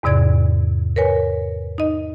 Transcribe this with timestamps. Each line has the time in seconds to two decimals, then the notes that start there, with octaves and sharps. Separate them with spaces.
0.03 E2 G#2 C3 D5 G#6
0.96 A#4 B4 C#5 G#5
1.78 D#4 D#5